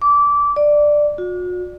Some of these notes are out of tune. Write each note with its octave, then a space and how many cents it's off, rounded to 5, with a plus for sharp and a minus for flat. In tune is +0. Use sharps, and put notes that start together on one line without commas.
D6 -20
D5 +10
F#4 -45